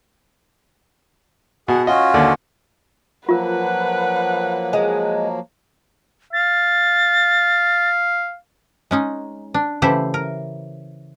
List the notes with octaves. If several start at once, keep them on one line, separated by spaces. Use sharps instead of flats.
B2 G#4 F#5
C#4 F4 F#4 D#5
D#2 D3 D5
F3 F#3 A#3 F4 A#4 B4 F#5
G#3
F5 A6
G#3 C#4 D#4
D4
C#3 E3 A3 E4 G4 C5
A#4